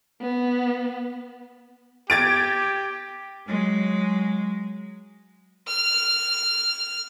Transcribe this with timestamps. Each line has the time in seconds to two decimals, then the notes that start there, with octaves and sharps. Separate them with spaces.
0.21 B3
2.10 G4 G#6 A6 D7
3.47 F#3 G#3
5.68 F6